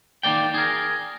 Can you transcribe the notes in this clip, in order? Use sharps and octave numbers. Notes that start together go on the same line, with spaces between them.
D#3 A#3 D5 G5
G#4 A#4